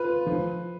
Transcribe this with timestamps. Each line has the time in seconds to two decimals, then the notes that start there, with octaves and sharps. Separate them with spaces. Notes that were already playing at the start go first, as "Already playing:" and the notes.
Already playing: F4 B4
0.27 F3